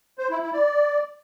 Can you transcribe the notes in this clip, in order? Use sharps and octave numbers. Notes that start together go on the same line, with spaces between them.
C5
E4
E4
D5